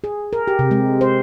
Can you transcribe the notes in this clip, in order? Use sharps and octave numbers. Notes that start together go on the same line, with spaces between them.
G#4
A#4
G4
C3
G#3
C5